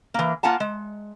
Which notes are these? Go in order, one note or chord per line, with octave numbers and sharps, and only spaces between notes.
E3 A#3
A#3 F4 F#5 G#5 A5
G#3